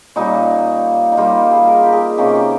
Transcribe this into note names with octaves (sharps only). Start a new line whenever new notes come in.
A#2 G3 A#3 C#4 D#4
D#4
D#3 G3 A#3 F4
G#4
A#4
G4
G#4
C3 D#3 A#3 C#4 G4
G4